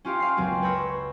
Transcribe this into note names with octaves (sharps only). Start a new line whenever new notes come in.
C#4 F4 G4 F5
F5 C7
C#2 F#2 F#3 A#3 C4
B4 C#5 B5 E6 G6 A#6